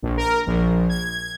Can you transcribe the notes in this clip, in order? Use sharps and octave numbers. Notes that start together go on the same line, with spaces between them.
A#1
A#4
A#1
G#6